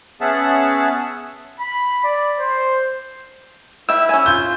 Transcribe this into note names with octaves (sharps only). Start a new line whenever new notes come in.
B3 C#4 G#4 E5 F#5 A5
B5
D5
C5
E4 E5 G5 E6
C#4 G#5
F4 G6